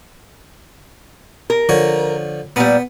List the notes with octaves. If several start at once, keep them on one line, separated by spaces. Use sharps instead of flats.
A#4
D3 F3 C#5
A#2 G3 B3